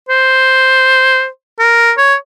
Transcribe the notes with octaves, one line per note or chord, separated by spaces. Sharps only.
C5
A#4
C#5